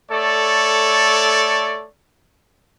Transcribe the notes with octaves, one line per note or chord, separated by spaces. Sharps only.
A3 A4 C#5 D5